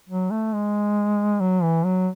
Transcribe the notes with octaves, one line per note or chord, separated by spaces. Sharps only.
F#3
A3
G#3
F#3
E3
F#3